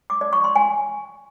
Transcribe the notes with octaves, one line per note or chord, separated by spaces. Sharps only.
D6
D5
C#6
C6
G#5